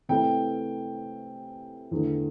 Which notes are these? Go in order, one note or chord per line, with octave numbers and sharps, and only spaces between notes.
C3 E3 A3 C4 G5
E2 D3 A3